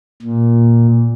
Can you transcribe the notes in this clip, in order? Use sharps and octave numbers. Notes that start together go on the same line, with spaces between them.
A#2